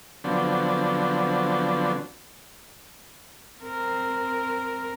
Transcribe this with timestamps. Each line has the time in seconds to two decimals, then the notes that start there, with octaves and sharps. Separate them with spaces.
0.24 D3 F3 F#3 B3 C4 D4
3.63 C4 A#4